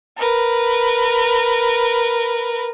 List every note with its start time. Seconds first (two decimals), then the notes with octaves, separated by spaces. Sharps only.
0.18 A#4 B4